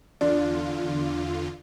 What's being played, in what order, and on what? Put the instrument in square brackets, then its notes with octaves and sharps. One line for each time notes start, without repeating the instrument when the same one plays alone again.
[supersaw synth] E2 D3 F4 [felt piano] D4 [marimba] D5